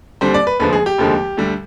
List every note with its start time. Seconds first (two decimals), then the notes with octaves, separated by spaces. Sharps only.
0.21 D#2 D3 G3 C4 C5
0.34 D5
0.47 B4
0.60 F1 D#2 D3 F3 G#3 B4
0.73 G#4
0.86 G4
0.98 F1 D#2 D3 F3 G#3
1.37 D2 D3 G3